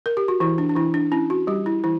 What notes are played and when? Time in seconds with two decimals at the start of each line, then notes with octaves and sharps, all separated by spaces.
0.06 A#4
0.17 G4
0.28 F#4
0.40 E3 E4
0.58 D4
0.69 D4
0.75 E3 E4
0.94 D4
1.12 C#4 E4
1.30 F#4
1.47 G3 G4
1.66 E4
1.84 E3 E4